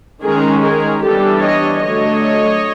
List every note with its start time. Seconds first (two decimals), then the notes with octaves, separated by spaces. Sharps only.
0.24 D#3 G#3 C#4 G#4 A#4
0.64 G#4 A#4
1.03 E3 G3 B3 D4 G4 A4
1.43 C#5 D#5
1.82 D3 F#3 A3 D4 C#5 D#5